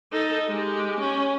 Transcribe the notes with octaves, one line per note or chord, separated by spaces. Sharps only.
D#4 A4
G#3 G4
C#4